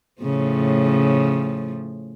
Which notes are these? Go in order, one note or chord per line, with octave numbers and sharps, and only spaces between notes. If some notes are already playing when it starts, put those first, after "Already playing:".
A2 C#3 F3